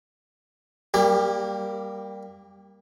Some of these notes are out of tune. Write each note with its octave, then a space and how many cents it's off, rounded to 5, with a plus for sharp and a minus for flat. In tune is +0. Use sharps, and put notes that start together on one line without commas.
G3 +0 A#3 +0 G4 +35